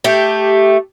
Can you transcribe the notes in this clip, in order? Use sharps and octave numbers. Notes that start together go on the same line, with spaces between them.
A3 G4